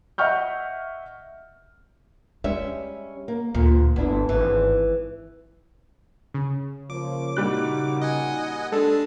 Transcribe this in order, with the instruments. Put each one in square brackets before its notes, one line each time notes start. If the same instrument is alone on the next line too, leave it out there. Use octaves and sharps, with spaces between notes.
[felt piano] D#5 E5 F#5 C#6 F6 G6
[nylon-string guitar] G3 C#4 E5 [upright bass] G#3
[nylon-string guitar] A#3
[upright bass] D2 [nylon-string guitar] A#2
[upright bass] G1 [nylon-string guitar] B3 D4 E4
[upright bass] G#1 [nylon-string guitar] E3
[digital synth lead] C#3
[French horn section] F3 A#3 C#5 [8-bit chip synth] D6
[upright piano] A#2 G3 F#6 [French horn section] D#4 F#4
[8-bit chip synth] D#5 F#5 G#5
[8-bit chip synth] G#3 D4 [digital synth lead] A4